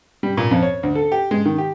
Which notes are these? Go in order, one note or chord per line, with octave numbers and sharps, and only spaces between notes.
G3
A#2
F2
C#5
D2
A4
G4
G#3
D#3
G4